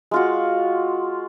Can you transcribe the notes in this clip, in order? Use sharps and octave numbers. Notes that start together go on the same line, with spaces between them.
G#3 F4 F#4